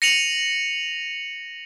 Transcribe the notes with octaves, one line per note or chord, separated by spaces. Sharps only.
A#6 C#7 D#7 F7 F#7